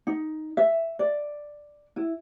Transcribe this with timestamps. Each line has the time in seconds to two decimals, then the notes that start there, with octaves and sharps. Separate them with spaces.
0.07 D#4
0.57 E5
0.99 D5
1.96 E4